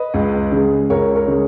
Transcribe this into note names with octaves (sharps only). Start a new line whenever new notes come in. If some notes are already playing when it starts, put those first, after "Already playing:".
Already playing: B4 D#5
C#2
C#3 G#3
C#2 A#4 C#5
A#4 C#5
C#3 G#3